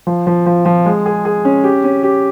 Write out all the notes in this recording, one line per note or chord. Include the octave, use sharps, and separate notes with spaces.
F3
F3
F3
F3
G#3
G#4
G#4
C#4
G4
C#4
G4